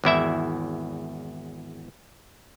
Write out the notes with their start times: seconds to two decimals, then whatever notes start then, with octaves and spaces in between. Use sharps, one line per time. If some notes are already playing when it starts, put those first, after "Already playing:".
0.04 G#1 E2 E4 E5